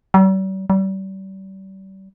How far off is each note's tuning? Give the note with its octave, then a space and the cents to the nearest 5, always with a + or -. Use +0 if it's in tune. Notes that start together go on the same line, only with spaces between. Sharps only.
G3 -45
G3 -35